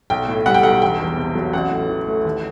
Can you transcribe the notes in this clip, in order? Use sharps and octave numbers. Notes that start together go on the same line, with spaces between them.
B1 G5
A2
G3 F#5
G5
B1 F#5
E1 G5
E2
C3
F#3
A1 F#5
A2
E3
A3
D#2